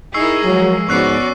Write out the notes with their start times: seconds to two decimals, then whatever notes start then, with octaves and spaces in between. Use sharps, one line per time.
0.14 D#4 E4 G#4 A#4 C#6 E6 C7
0.44 F3 F#3 G#3
0.89 G#2 B3 C#4 F#4 D5 C#6 F#6 C7